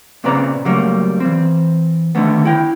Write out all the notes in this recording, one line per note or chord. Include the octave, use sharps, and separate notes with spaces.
A#2 C#3 C4 B4 D5 A#5
C#3 F#3 G3 A3 A#3
E3 C4
D3 D#3 A3 B3
E4 G5